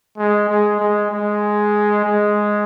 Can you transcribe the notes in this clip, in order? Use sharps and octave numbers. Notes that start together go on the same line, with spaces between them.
G#3
G#3
G#3
G#3
G#3